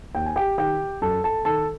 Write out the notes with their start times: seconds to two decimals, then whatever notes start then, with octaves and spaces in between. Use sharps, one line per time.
0.15 D#2 G5
0.26 G#5
0.36 G4 G5
0.58 D#3 G4 G5
1.01 F#2 A4 A5
1.24 A4 A5
1.45 D#3 A4 A5